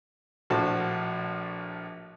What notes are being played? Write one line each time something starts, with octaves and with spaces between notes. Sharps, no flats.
A#1 A2 F3 F#4 C5 A5